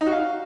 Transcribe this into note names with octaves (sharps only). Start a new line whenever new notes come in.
D#4
F#4
F5